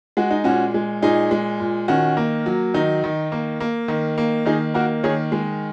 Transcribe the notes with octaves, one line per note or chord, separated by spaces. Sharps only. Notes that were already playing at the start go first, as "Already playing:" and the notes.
G#3 F#4
D#4
A#2 C#4 F#4
G#3
A#2 D#4 G#4
G#3
A#2
D#3 C#4 F#4
A#3
F#3
D#3 D#4
D#3
A#3
A#3
D#3
A#3
D#3 D#4 G#4
A#3 F#4 A#4
D#3 G#4 C#5
G#3